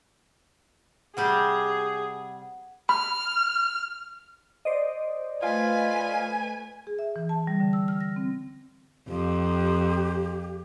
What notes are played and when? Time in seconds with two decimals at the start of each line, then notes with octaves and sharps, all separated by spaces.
1.17 C3 G3 G4 G#4 F#5
2.89 B5 F6
4.65 C5 D5 D#5
5.43 A3 F4 B4 G#5
6.87 G#4
6.99 E5
7.16 E3
7.29 A5
7.47 G3
7.60 D3
7.73 E6
7.88 F6
8.00 A#6
8.16 C4
9.08 F2 G4